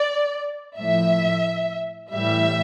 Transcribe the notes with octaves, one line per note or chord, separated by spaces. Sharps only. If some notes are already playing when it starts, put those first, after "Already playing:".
Already playing: D5
A2 F3 E5
A2 E3 G3 E5